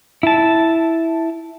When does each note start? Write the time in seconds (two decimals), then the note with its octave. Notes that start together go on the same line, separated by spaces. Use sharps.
0.23 E4 A5